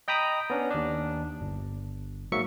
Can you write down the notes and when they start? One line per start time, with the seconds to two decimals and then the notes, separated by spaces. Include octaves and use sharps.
0.08 D#5 G5 A#5 B5 D#6
0.50 B3 C#4 D4
0.71 D#2 D4
1.41 G1
2.32 G#2 F#3 A#3 E5 C#6 C#7